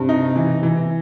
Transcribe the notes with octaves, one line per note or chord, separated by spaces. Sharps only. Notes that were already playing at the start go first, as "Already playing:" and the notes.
Already playing: G2 C3
D#4
E3
E3